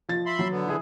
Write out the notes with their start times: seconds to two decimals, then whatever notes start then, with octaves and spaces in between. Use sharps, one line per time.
0.09 F3 A6
0.26 E5 B5 C6
0.39 F#3
0.51 D3 B3
0.66 E3 E4 G#4